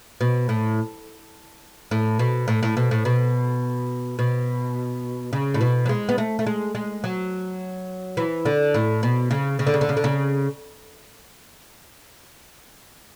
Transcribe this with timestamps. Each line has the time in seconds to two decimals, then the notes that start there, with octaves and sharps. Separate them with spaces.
0.21 B2
0.49 A2
1.91 A2
2.19 B2
2.48 A2
2.63 A2
2.77 B2
2.91 A2
3.05 B2
4.19 B2
5.33 C#3
5.54 A2
5.61 B2
5.86 F#3
5.89 G#3
6.09 B3
6.18 A3
6.39 A3
6.47 G#3
6.75 G#3
7.04 F#3
8.17 E3
8.45 D3
8.74 A2
9.03 B2
9.31 C#3
9.59 C#3
9.67 D3
9.74 C#3
9.81 D3
9.89 C#3
9.97 D3
10.04 C#3